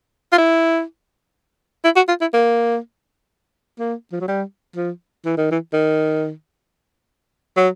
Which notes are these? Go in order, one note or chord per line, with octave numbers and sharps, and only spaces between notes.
F4
E4
E4
F#4
F4
E4
A#3
A#3
F3
F#3
G3
F3
E3
D#3
E3
D#3
F#3